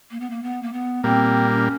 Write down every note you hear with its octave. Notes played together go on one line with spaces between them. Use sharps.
A#3
B3
A#3
B3
A#3
B3
A#2 G3 A#3 C4
C#4